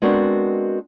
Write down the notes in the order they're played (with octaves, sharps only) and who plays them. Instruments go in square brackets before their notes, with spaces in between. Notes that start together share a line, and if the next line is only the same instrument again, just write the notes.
[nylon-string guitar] G#3 B3 C4 D4 F#4 A#4